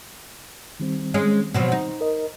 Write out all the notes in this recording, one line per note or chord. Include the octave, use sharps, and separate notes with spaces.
D#3 G3 C4
G#3 C#4
B2 F3 F#3
D#4
A#4 D#5